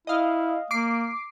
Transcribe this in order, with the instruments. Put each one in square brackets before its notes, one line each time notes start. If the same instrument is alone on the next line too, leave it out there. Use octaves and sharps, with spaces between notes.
[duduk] E4 [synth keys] D#5 F5
[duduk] A#3 [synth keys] D6 C7